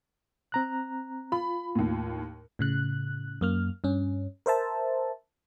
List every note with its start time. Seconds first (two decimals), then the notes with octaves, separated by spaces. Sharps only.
0.52 C4 A#5 F#6
1.32 F4 B5
1.75 D#2 A2
2.59 A2 C#3 F#6
3.41 F#2 A#3 F6
3.84 G2 C#4
4.46 A#4 C5 E5 A5